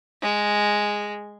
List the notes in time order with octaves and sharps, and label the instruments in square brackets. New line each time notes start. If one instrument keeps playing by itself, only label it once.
[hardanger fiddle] G#3